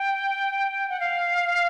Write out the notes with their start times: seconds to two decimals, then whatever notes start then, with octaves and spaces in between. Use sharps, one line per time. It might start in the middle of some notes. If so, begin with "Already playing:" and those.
Already playing: G5
0.89 F#5
1.00 F5